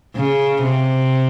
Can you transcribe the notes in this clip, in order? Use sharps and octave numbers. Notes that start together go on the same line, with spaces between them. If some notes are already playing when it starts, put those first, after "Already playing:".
C#3
C3